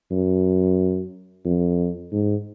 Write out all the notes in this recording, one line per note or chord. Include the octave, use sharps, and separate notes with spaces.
F#2
F2
G#2